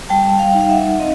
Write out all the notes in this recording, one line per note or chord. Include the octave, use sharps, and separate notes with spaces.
G3 G5 A5
F5 G5
D#4
F5
E5 F#5
C4 D#5 F5